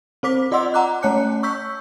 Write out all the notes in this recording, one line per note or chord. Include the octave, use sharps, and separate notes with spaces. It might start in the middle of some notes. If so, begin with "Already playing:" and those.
C4 C5 D6 B6
F4 D5 D#5 F#5 C6 E6
F#5 A#5 D6 F#6
A3 C#4 C#5 A5 F#6 C#7
C#6 E6 G6 B6